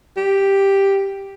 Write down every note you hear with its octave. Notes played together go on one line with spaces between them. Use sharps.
G4